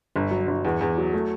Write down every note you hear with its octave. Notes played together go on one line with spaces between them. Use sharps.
G1
F#3
G1
E2
E2
F#3
A3